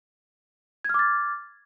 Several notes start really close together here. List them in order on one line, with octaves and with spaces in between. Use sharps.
G#6 F6 D6 A6